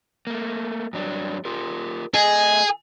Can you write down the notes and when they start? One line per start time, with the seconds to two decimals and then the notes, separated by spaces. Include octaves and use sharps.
0.27 A3 A#3
0.93 G2 F#3 D4
1.45 F4 G4 A#4
2.15 A3 G#4 D#5